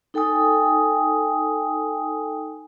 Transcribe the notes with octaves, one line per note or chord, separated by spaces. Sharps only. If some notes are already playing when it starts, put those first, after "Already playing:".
D#4 A4 G5 G#5 D#6